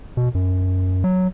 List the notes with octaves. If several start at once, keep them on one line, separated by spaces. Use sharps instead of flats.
B2
F#2
F#3